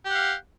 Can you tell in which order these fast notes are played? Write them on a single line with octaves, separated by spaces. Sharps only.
G4 F#5 F5